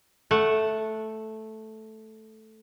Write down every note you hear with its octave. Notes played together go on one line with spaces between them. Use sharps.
A3 F#5